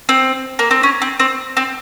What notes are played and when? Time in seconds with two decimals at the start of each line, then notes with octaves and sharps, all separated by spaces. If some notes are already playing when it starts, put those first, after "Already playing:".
0.09 C4
0.59 A#3
0.71 C4
0.83 C#4
1.02 C4
1.20 C4
1.57 C4